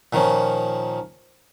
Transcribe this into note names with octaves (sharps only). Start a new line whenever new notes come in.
A#2 D#3 F3 C#4